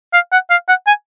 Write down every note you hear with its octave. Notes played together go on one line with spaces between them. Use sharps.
F5
F#5
F5
F#5
G#5